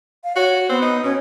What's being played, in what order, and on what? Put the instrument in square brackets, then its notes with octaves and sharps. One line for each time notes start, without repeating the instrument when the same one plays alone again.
[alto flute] F5
[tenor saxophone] F#4 [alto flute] C#5
[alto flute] B3 [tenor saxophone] C4
[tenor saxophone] D#4
[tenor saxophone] B2 [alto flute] C#4